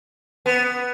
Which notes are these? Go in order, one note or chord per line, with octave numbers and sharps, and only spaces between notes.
B3